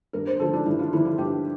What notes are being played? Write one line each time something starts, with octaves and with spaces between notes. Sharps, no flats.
G2 A#4
C5
D3 F3 A3 A4
D4
G2 E4
F4
D3 F3 A3 E4
F4
G2 G4